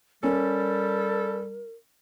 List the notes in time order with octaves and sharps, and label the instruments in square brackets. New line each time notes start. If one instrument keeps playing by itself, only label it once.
[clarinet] G3 [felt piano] C#4 [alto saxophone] A4 [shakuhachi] A#4